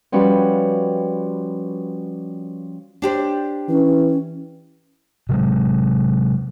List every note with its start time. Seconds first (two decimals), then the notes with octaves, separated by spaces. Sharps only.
0.12 F3 G3 C#4 F#4 B4
3.02 D4 G4 C5
3.69 E3 C#4
5.29 C3 F#3 G#3